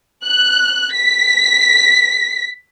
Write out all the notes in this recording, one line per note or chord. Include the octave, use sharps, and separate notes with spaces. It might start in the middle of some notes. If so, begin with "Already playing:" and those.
F#6
B6